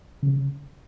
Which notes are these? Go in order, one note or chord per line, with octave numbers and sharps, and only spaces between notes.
C#3